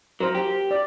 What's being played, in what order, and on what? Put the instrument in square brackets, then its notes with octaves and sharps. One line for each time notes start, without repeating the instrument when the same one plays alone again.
[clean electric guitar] F#3 [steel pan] A#4 C5
[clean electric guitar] G4
[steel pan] D5